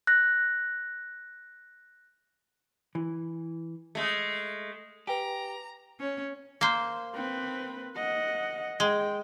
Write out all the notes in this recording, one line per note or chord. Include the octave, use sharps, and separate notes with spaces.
F#6 A#6
E3
G#3 A3
G4 B4 G5 G#5 A#5
C#4
A#3 C5
C4 B4
D#5 F#5
G#3 G5